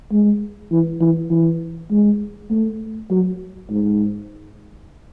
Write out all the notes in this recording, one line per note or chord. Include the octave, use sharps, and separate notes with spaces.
G#3
E3
E3
E3
G#3
A3
F#3
G#2